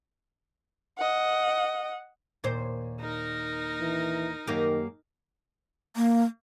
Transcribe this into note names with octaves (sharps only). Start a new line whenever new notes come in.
D#5 F#5
D#2 A#2 C5
D#4 A#4
E3
F#2 D#3 A#3 G4
A#3